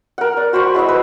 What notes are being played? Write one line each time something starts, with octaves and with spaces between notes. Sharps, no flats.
A#4 F#5
D5
F#4 C5 B5 C#6
G#3 E4 D#5 E5
B4